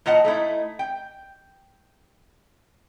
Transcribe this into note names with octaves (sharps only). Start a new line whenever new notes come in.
A#2 F4 D#5 F#5 A5
A3 D#4 E4
G5